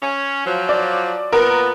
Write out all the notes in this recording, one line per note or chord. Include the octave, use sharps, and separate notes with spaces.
C#4
F3 F#3
D5
A#2 B3 A#4